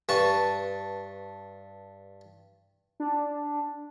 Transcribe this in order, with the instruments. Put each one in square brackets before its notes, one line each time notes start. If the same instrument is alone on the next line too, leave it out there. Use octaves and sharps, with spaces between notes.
[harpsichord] G2 B4 A5 C#6
[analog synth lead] D4